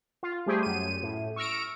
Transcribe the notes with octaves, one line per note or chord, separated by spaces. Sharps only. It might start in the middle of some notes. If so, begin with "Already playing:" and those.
F4
G3 A3 G4 G#4 C5
F#2 D#7
A2
C#6 E6 F6 A#6 D7